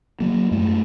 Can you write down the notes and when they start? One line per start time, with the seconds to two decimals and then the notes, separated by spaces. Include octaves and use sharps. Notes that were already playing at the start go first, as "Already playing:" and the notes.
0.20 F#3 A#3
0.51 F#2 G#3 A3